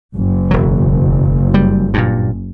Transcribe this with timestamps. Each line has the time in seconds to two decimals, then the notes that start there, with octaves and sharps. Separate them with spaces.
0.16 F#1
0.51 E1 F#3
1.54 G3
1.94 G2 A#2